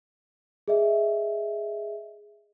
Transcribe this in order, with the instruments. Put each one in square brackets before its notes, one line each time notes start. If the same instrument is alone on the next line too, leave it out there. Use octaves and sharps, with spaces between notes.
[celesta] G#4 D#5 E5